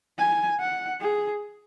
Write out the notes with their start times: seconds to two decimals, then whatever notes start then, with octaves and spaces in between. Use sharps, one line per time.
0.19 G#5
0.60 F#5
1.01 G#4